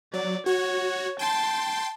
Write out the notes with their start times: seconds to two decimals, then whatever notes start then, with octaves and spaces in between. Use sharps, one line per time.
0.14 F#3 D5
0.46 F#4 C#5
1.19 G5 A5 C6